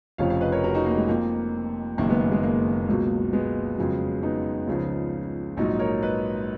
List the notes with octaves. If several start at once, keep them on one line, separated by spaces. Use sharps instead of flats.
F1 F2 C#3 F3 C#5 F5
C#5 F5
B4 D#5
A#4 C#5
F#4 A#4
D#4 F#4
A#3
G#3
F2 F3 A#3
F#1 F#2 D#3 A#3
G#3 B3
A#3
G#3
A#3
C#2 B2 F#3
G#3 B3
F2 C#3 F#3
B3 D#4
C#2 C#3 F3
A#1 G#2 F#3 D#4 F#4
A#4 C#5
B4 D#5